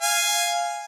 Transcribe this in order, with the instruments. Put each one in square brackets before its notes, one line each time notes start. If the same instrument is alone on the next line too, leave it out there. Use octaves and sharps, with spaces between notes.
[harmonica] F5 G#5